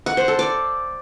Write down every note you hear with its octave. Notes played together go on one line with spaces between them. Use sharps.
F#5
C5
A4
D5